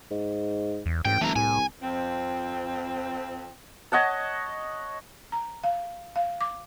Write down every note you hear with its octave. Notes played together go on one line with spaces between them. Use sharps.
G#2
E2
A1 G#2 G5
D#1 E3 A3 A#5
C2 A2 G#5
F2 C4
C#5 D#5 F#5 A5
A#5
F5
F5
D6